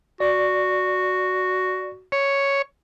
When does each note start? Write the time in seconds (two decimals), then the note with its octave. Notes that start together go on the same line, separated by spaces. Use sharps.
0.20 F#4 D5
2.12 C#5